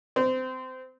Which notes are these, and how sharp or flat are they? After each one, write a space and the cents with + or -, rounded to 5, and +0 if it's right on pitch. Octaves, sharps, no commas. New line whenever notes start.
C4 -25